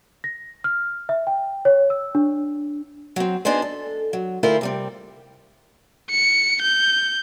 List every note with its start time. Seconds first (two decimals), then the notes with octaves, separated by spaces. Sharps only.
0.24 A#6
0.64 F6
1.09 E5
1.27 G5
1.65 C#5
1.90 E6
2.15 D4
3.16 F#3 C4
3.45 B3 D4 D#4 G#4 C5
3.62 A4
4.13 F#3
4.43 D2 E4 F4 A#4 C5
4.61 C3 G3 C4
6.11 C#7
6.62 G6